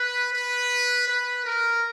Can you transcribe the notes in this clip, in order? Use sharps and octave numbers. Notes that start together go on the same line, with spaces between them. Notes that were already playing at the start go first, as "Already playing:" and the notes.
Already playing: B4
B4
B4
A#4